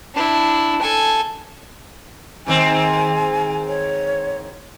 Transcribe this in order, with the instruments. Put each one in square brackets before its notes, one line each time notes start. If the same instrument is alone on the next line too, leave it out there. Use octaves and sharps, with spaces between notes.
[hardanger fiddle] D4 E4
A4 G#5
[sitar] G#2 D#3 C4 [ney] G#5
[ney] C#5